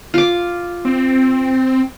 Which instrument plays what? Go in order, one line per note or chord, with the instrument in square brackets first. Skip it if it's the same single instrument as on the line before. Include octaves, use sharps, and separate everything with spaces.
[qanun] F4 D6
[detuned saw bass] C4